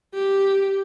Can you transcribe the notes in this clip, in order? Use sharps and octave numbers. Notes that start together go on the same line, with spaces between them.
G4